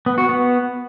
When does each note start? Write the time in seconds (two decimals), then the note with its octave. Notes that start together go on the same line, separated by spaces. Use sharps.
0.06 B3
0.18 F#4
0.29 B3